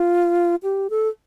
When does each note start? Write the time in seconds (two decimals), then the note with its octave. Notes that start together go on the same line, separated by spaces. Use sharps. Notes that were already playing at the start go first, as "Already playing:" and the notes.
Already playing: F4
0.63 G4
0.90 A4